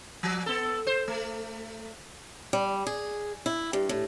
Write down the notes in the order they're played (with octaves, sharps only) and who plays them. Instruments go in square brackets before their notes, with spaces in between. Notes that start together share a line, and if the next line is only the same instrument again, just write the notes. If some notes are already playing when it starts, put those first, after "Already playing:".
[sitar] F3
B3 A4
C5
A3
[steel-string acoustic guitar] G3
G#4
E4
G2
A2